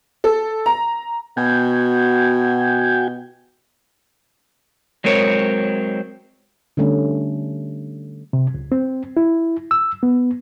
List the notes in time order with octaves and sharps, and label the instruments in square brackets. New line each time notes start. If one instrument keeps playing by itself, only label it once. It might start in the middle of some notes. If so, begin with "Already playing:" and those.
[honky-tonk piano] A4
A#5
[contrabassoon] B2 [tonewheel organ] F#4 G5 G#5
[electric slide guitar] F#3 G#3 C4 A#4 C#5
[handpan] D3 G3 A3 C#4
[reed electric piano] C3
C#2
C4
E4
E6
B3